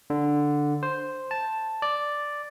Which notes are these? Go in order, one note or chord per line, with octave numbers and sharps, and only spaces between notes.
D3
C5
A5
D5